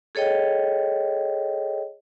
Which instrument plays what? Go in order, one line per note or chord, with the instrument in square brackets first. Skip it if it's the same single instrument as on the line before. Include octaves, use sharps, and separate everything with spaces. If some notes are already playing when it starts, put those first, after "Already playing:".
[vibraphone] G#4 A4 C#5 D#5 G5